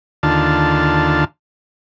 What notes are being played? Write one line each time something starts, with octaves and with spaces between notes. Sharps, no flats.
D#2 D3 F4 A5